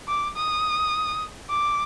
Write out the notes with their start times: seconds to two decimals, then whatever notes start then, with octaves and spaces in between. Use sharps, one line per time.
0.08 D6
0.36 D#6
1.50 D6